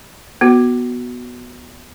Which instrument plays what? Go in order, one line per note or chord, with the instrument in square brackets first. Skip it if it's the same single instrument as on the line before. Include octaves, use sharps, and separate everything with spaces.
[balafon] B3 F#4